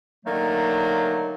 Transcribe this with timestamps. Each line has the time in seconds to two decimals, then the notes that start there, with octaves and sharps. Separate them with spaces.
0.25 D3 D#3 F#3 A3 A#3